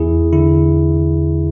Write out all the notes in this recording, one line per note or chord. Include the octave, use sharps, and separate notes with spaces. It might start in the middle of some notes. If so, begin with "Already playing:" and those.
Already playing: E2 E4 G#4
D3 E4